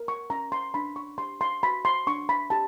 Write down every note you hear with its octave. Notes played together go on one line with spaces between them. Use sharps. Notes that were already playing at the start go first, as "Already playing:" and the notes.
Already playing: A#4
C#6
C#4 A#5
C6
D4 B5
C#6
G4 C6
C6
F#4 B5
C6
D4 C#6
B5
G4 A5